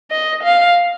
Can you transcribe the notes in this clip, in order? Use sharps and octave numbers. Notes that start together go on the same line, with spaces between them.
D#5
F5